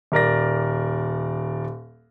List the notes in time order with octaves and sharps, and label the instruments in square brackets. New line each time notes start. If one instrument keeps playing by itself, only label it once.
[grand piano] D#1 A#4 D5 A#6